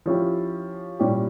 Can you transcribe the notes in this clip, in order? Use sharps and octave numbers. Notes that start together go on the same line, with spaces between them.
F3 C#4 E4 G4
A#2 G3 C#4 E4 G4